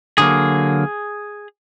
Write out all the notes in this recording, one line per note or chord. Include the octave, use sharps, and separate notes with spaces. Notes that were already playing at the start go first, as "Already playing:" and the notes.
D3 F#3 A#3 G#4